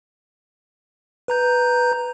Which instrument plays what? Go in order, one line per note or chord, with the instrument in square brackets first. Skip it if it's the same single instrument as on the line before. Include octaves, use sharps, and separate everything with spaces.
[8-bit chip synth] B4 A#5 G6